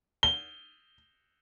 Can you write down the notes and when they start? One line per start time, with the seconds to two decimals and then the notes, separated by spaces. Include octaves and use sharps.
0.23 G7